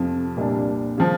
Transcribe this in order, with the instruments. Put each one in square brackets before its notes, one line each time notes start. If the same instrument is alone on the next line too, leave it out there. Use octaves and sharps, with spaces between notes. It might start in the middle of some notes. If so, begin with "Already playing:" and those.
Already playing: [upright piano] F2 C3 F3
C2 A#2 G3 A#3 D4
C#3 F3